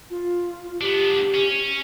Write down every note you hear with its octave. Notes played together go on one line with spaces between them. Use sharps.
F4
B3 D4 G4
C#4